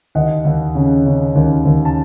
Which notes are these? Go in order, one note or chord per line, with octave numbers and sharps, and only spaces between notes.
D#2 D#5 F#5
D#2
C#3
C#3
D#2
D#2
A5